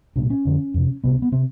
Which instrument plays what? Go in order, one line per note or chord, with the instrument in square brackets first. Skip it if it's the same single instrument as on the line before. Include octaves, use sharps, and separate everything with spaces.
[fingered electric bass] C2 A#2 D4
C#4
F2 D3
F2 C3
C2 C3 B3
C4
B3
C3 C4